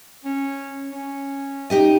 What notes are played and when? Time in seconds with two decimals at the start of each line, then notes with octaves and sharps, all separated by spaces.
0.25 C#4
0.92 C#4
1.70 D#4 G4 D#5